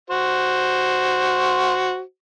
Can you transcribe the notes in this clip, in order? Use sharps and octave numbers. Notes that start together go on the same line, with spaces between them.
F#4 C5